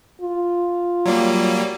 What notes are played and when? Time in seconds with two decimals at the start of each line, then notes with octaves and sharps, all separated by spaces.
0.22 F4
1.06 F#3 G3 A#3